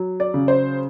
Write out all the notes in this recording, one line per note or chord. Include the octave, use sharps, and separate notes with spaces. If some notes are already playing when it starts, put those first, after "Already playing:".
Already playing: F#3
D5
C#3
C5